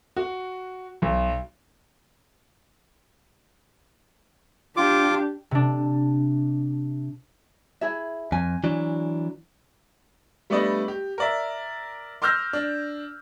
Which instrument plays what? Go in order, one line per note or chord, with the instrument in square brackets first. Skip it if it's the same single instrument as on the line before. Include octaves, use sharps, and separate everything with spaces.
[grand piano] F#4
B1
[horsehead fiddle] D4 G4 [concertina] F4 D6
[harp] C3 D4
[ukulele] E4 G#4 E5
[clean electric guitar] F2 [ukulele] G#5
[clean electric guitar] E3 F#3 D4
[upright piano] G3 A3 B3 D4 D5 D#5
G4
A#4 D5 E5
C6 D6 E6 F6 G6 A#6
D4